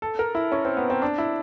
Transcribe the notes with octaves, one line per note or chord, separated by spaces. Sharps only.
A4
A#4
E4
C#4
C4
B3
C4
D4
E4